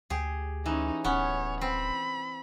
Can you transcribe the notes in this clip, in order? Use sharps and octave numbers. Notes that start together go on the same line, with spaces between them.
D2 G4 G#4
E3 C#4 D#4
D1 B3 C#4 C#5
C4 B5